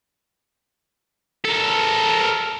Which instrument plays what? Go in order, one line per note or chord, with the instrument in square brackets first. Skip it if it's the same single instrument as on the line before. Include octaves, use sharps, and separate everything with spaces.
[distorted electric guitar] A4 A#4